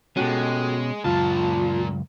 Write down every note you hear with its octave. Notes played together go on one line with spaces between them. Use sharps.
B2 G#3 C#4 F#4 G4 A4
C#2 F#2 A#2 F4 A5